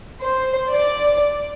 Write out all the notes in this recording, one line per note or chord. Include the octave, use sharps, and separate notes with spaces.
C5
D5